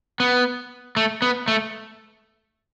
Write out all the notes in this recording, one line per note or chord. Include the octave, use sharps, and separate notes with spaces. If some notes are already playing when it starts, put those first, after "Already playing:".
B3
A3
B3
A3